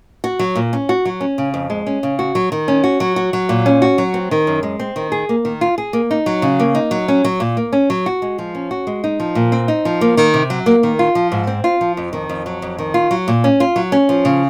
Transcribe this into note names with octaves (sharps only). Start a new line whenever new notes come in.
F#4
F#3
A#2
C#4
F#4
F#3
C#4
C#3
F2
G#3
C#4
C#3
F#4
F#3
D#3
C#4
F#4
F#3
F#4
F#3
A#2
C#4
F#4
F#3
C4
D#3
F#2
G#3
C4
D#3
G#4
A#3
D#3
F4
G#4
A#3
D#4
F#3
C#3
A#3
D#4
F#3
C#4
F#3
A#2
A#3
C#4
F#3
F#4
G#3
F3
C#4
F#4
G#3
D#4
F3
A#2
C4
D#4
F3
A#3
D#3
C3
F#3
A#3
D#3
F4
F3
G#2
C4
F4
F3
F2
D#3
F2
F#3
F2
D#3
F4
F#3
A#2
C#4
F4
F#3
C#4
F3
C#3